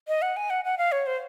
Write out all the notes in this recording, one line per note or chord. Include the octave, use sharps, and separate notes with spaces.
D#5
F#5
G#5
F#5
F#5
F5
C#5
C5